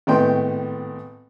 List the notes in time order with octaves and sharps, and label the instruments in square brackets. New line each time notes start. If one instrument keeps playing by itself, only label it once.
[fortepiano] G#1 A2 B3 G5 C6